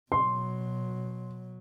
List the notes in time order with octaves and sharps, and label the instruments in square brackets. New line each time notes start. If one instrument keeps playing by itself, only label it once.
[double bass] B2 F#3 [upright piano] C6